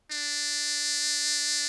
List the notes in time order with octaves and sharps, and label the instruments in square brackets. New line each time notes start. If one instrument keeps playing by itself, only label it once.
[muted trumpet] D4